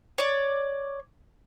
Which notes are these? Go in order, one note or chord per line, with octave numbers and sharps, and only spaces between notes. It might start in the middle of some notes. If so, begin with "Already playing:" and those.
C#5 D5